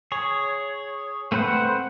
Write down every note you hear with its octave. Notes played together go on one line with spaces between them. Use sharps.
G#4 C#5
A3 C4 B4 C5 F#5